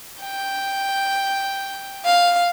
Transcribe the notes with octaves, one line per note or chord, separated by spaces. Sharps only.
G5
F5